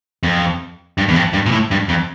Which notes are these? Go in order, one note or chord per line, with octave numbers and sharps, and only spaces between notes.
F2
G2
E2
F2
G2
A#2
A2
G2
F2